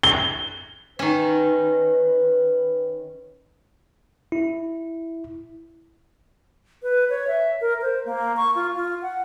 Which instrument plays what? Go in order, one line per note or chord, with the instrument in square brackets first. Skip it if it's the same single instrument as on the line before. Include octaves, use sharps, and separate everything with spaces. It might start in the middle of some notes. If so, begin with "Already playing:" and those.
[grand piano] G7
[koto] D#3 C#4 [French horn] B4
[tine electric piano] E4
[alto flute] B4
C#5
E5
A#4
C5
A#3
C#6
F4
F4
F#5